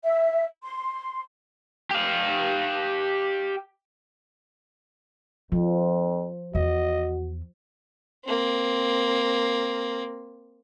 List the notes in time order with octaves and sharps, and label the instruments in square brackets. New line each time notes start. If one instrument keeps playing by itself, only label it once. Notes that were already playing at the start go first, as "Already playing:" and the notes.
[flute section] E5
C6
[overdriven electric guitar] G4 F5
[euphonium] F2 [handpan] F3 [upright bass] D#4
[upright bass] E2 [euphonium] F#4 [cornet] D#5
[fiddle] A#3 C4